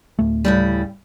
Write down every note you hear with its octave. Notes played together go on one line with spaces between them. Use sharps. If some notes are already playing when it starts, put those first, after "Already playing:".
D1 A3
A2 C#3 G3